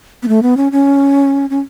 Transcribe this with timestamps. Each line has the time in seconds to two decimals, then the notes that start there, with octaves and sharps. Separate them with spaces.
0.23 B3
0.28 A3
0.43 B3
0.57 C#4
0.72 C#4
1.50 C#4